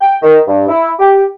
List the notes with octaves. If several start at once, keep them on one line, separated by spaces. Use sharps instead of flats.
G5
D#3
G2
E4
G4